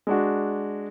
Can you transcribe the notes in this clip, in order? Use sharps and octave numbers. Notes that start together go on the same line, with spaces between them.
G#3 D4 F#4